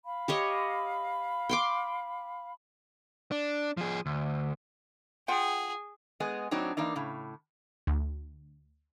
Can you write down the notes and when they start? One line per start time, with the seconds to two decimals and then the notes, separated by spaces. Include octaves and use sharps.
0.05 F5 B5
0.28 G4 C#5 D#5
1.49 G5 C6 D6
3.31 D4
3.77 F3 G#4
4.06 D2
5.28 F4 G#4 F#5 G5
6.20 G#3 B3 G#4 D#5
6.51 A2 F#3 C4 D4 D#4
6.77 E3 A#3 D4 D#4
6.95 A2 C#3
7.87 D2